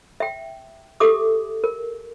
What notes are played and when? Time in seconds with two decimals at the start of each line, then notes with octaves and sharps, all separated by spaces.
0.20 E5 G5
1.00 G4 A4 E5 D6 D#6
1.64 A#4